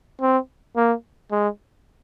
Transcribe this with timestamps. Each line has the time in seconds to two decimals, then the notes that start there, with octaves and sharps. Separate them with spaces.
0.21 C4
0.76 A#3
1.32 G#3